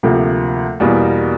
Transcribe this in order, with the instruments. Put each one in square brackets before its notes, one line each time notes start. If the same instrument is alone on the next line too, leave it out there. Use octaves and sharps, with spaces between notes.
[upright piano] D2 C3 F3 A#3
E2 B2 G3 A#3